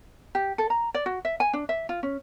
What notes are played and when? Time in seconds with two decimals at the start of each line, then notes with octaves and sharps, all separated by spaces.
0.35 G4
0.58 A4
0.70 A#5
0.94 D5
1.06 F#4
1.25 E5
1.40 G#5
1.53 D4
1.69 E5
1.89 F4
2.03 C#4